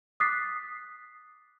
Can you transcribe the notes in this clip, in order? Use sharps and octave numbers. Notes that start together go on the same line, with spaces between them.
D6 D#6 F#6 A6 B6 C7